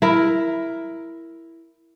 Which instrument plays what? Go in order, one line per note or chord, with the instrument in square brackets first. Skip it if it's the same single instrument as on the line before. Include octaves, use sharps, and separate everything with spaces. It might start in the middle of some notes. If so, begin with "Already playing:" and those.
[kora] E4 A#4